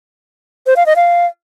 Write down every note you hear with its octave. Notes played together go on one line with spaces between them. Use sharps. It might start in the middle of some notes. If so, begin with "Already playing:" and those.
C5
F5
D#5
F5